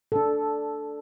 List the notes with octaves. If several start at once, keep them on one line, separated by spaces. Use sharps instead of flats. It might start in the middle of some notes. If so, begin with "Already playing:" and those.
D4 A4